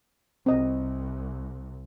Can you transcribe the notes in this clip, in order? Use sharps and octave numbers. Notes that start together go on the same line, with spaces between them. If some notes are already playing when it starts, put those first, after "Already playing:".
C2 C4 D#5